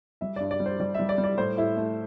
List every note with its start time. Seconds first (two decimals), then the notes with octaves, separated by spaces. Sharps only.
0.21 G3 E5
0.36 G2 D5
0.51 D5
0.60 G3
0.66 C5
0.80 G3 D5
0.94 E5
1.00 G3
1.09 D5
1.18 G3
1.24 D5
1.38 A2 C5
1.57 A2 E4
1.77 A3